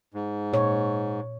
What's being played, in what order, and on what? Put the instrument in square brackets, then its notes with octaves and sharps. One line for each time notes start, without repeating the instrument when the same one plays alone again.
[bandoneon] G#2
[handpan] A#2 C#5